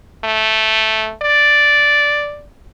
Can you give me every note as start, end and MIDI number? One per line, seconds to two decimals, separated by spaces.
0.24 1.12 57
1.22 2.43 74